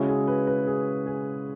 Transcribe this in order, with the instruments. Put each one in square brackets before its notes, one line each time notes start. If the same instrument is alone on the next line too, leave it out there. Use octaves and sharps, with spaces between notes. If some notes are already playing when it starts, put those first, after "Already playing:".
Already playing: [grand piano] C#3 G#3 C#4 E4 F#4
G#4
B4
B4
G#4
G#4